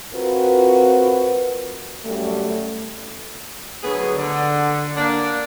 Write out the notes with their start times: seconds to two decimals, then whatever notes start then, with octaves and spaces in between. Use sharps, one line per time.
0.14 C4 F4 F#4 A#4 B4
2.04 F#2 G3 A3
3.83 D2 F#3 B3 G#4
4.17 D3
4.97 A#3 D4